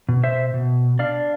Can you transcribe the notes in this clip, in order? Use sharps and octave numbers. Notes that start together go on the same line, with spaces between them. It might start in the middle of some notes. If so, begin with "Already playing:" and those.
B2
C5 E5
B2
D4 D5 F5